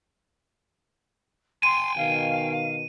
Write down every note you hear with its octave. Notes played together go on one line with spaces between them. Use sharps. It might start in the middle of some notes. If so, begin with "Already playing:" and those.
G5 G#5 C6 D#7
B2 D#3 F5